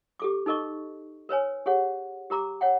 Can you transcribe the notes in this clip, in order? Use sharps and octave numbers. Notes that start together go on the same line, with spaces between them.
G4 A4 D6
D#4 A4 A#4 D#5 C#6
A#4 B4 C#5 G#5
G4 G#4 C#5 F#5
G4 A#4 A#5 D6
C#5 F#5 G5